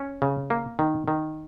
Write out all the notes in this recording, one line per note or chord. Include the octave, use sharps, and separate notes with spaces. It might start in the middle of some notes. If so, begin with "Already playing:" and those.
Already playing: C#4
C#3
A#3
D#3
D#3